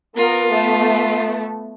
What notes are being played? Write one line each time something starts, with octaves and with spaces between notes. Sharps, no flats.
B3 F4 A#4
A3 B3